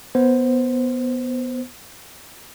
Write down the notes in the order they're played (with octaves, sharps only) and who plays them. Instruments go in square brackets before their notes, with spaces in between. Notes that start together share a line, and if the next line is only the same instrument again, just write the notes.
[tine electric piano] B3 C5